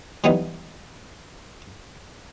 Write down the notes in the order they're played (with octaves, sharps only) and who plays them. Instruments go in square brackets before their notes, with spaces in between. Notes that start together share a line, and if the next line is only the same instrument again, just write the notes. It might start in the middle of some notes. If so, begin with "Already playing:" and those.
[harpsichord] E3 F#3 G3 B3 D#4